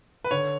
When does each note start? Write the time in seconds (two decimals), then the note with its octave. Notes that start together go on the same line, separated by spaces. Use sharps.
0.24 B4
0.31 D3 C#5